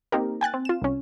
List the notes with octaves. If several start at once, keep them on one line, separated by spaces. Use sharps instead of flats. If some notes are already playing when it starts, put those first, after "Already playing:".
A#3 C4 D#4 G4 A#4
G5 G#5 F#6 A6
C4
F4 E7
C2 C#4